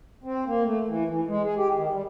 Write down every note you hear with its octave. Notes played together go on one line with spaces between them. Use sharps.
C4
A#3
A3
E3
E3
G#3
G#4
G4
D#3
G3